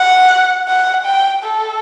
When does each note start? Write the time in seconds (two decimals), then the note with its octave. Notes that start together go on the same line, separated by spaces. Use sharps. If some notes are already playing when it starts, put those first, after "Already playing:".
Already playing: F#5
0.68 F#5
1.06 G5
1.43 A4